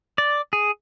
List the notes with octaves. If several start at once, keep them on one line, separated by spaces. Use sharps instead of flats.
D5
G#4